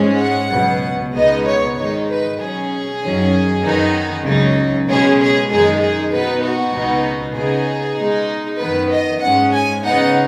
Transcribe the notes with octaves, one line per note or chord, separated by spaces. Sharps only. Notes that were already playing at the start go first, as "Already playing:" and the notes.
Already playing: G#2 G#3 C#4
F#5
C#2 B2 F#3 B3
C#2 B2 G#3 B3 D#4 D#5
C#5
G#2 D#3 G#3 D#4 C#5
B4
B2 F#3 C#4 G#4
F#2 D#3 F#3 C#4
F#2 D#3 B3 D#4
C#2 C#3 F#3 D#4
B2 G#3 C#4 G#4
G#4
F#2 D#3 G#3 D#4 G#4
G#4
B2 B3 D#4 B4
F#4
C#2 B2 B3 D#4
C#3 B3 D#4 G#4
B2 G#3 D#4
F#2 D#3 B3 B4
D#5
G#2 G#3 C#4 F#5
G#5
C#3 B3 D#4 F#5